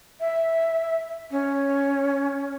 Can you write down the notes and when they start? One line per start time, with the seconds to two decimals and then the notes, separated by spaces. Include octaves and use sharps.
0.20 E5
1.31 C#4